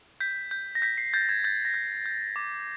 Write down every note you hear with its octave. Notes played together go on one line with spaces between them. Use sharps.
G6 B6
G6
A#6
G6 B6
C7
G6 A6
G#6
G6 A6
A#6
G6
G6
D6